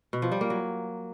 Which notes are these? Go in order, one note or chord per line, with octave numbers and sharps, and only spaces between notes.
B2
F3
G3
A#3
F#3